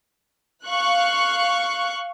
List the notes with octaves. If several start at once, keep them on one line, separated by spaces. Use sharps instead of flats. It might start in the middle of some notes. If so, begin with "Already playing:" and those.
F5 C#6 F#6